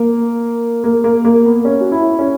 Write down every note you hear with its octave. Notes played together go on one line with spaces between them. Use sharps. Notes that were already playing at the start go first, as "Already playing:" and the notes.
Already playing: A#3
A#3
A#3
A#3
B3
C#4
F#4
E4
C#4